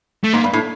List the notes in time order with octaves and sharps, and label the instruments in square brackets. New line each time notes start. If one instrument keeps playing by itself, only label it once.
[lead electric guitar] A3
[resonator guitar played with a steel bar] G#2 [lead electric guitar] A#3
[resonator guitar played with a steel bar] G2
A2